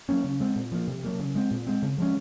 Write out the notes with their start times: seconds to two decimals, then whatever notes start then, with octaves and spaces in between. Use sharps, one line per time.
0.09 F#3 A#3 C#4
0.24 C#3
0.40 G#3 C4
0.56 A#2
0.72 F3 A#3
0.88 C3
1.04 F#3 A#3
1.19 C#3
1.35 G#3 C4
1.51 A#2
1.67 G#3 C4
1.83 C#3
1.98 F3 G#3 C#4